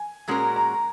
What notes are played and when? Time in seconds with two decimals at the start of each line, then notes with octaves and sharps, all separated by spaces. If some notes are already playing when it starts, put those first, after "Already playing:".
Already playing: G#5
0.28 A#2 G#3 C#4 F#4 A#4
0.56 A#5